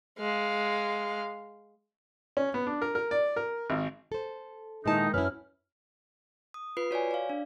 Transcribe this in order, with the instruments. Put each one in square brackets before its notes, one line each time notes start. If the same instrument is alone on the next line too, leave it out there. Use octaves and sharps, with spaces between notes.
[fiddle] G#3 F5
[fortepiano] C#4
B3
D4
A#4
A#4
D5
A#4
G#1
[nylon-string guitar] A4 C5
[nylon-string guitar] A#2 E4 A5 [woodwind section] D#3 D#4 [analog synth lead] G#3
[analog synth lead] F#2 [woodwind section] C#4 F6 [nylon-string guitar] E4 B4
[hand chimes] D#6
F4 B4 C7
F#4 C#5 D5 G#5
D5 F5
D4